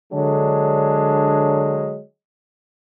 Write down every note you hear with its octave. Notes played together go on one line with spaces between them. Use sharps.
D3 F#3 G#3 D4